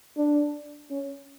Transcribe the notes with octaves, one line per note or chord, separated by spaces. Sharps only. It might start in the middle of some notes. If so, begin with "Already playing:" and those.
D4
C#4